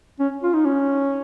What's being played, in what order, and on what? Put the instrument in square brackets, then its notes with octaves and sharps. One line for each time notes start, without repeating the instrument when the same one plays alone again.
[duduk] C#4
F4
D#4
C#4